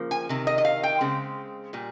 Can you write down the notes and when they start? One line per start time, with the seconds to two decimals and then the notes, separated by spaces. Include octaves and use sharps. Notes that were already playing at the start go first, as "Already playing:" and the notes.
Already playing: C#3 F3 A#3
0.11 G#5
0.29 C3 D#3
0.47 D#5
0.58 D#5
0.65 F5
0.83 G5
1.00 C#3 G#3 C4
1.73 A#2 G3